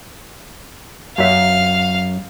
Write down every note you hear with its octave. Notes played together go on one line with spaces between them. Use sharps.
F#2 E5 F5